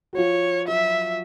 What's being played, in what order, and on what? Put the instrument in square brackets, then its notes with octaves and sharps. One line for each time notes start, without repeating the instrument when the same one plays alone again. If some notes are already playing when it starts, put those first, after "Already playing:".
[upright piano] F#4
[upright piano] F3 F4 [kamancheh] C#5
[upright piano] F#3 F#4 [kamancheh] E5